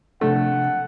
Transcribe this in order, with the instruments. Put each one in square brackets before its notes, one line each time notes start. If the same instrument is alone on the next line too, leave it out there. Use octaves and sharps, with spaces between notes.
[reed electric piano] C3 F3 D4 [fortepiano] A3 [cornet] F#5